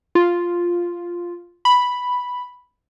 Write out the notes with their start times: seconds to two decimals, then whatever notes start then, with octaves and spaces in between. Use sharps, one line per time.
0.15 F4
1.65 B5